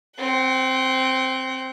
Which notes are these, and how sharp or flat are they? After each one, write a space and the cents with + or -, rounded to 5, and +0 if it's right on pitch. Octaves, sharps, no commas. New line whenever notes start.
C4 +0 F#5 +45